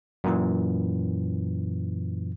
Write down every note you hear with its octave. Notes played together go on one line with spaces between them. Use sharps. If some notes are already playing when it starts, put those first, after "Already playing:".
F#2 A#2 E3